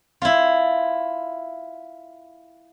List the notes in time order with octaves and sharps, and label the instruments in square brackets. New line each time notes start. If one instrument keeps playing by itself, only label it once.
[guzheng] E4 F4